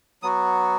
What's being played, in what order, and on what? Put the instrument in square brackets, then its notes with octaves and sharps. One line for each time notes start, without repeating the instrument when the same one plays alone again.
[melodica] F#3 B3 F#4 D#6